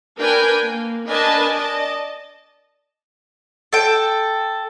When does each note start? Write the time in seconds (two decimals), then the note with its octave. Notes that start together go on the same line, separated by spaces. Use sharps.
0.20 D4 A#4 B4 G5 G#5
0.64 A#3
1.06 D4 A#4 B4 D#5 G#5 A5
1.50 D5 D#5 A5
3.73 A4 G5